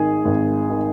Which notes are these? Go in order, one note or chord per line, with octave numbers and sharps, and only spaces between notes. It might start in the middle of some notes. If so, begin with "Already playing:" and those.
Already playing: G#1 D#3 G#4
G#1
D#3